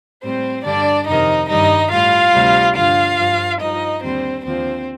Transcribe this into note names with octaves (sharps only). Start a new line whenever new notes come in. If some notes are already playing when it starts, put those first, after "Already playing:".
A2 G3 C4 C5
G2 D3 G3 D4 D5
F2 C3 D#3 D#4 D#5
G2 D#3 G3 D#4 D#5
A2 G3 F4 F5
D2 C3 G3
G2 D3 F3 F4 F5
G2 F3
G2 F3 D#4 D#5
D#2 D3 G3 C4 C5
D#2 D3 F3 C4 C5